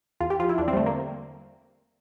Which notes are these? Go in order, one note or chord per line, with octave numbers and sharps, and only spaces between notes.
E2 F4
G4
F3 F4
E4
E2 D4
C4
G3
D3 A3
A#3